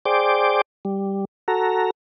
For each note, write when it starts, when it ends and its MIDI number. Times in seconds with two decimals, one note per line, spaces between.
0.05 0.61 68
0.05 0.61 72
0.05 0.61 74
0.05 0.61 79
0.05 0.61 86
0.85 1.25 55
1.48 1.90 66
1.48 1.90 69
1.48 1.90 82